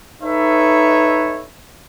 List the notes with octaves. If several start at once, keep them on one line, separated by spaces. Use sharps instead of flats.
D#4 A4 B4 C#5 E5